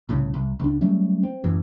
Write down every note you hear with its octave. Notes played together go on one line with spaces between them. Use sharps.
C2 A2 C#3
C2
C#2 D4
F#3 G3 A3 C#4
C4
A1 F#2 E3